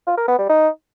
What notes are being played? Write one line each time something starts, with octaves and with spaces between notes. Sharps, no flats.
F4
A#4
B3
G3
D#4